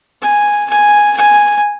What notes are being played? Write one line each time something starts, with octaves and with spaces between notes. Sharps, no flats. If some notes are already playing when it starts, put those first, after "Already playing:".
G#5
G#5
G#5